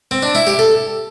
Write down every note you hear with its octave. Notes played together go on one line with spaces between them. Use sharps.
C4
D4
E4
G4
A4